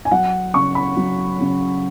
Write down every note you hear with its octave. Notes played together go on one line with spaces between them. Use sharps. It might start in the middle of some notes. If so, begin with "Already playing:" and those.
G#5
F#3 F#5
C#3 C#6
B5
F#3
C#3